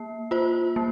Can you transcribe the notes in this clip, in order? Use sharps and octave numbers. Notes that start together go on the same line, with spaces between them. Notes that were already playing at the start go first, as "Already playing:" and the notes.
Already playing: A#3
F4 C5
A#3